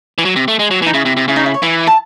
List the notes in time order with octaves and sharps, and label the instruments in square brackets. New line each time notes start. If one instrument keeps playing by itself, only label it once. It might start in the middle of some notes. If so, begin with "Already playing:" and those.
[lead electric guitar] E3
F#3
C3
A3
G#3
F#3
E3
[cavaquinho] D#4
[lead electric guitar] C#3 [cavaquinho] E4
[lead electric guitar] C3
C3
[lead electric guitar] C#3 [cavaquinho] E4
[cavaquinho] D#4
E4
C#5
[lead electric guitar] E3 [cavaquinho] E4 E5
[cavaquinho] A5